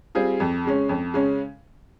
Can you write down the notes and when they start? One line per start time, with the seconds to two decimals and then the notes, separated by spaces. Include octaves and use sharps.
0.15 G3 C4 F4 G#4
0.40 F2
0.65 C#3 G#3 C#4
0.89 F2
1.14 C#3 G#3 C#4